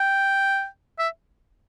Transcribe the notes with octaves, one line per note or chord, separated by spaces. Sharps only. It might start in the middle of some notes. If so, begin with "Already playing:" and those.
Already playing: G5
E5